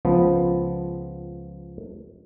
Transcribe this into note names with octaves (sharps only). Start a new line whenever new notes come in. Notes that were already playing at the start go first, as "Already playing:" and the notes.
C#2 F3 B3